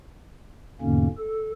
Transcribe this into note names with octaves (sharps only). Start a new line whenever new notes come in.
E2 G#2 B2 D3 A#3 C#4
A4